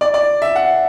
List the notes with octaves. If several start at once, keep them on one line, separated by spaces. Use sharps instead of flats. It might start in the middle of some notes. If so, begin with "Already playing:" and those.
D5
D5
E5
F#5